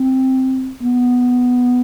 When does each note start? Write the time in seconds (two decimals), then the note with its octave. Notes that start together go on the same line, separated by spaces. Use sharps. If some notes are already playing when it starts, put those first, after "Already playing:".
Already playing: C4
0.83 B3